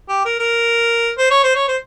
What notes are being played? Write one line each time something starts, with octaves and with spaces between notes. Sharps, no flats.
G4
A#4
A#4
C5
C#5
C5
C#5
C5